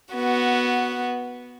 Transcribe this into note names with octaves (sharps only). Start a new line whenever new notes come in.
B3 F#4